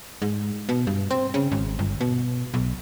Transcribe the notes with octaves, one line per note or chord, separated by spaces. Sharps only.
G#2
B2
G2
C4
C#3
G#1
G1
B2
B1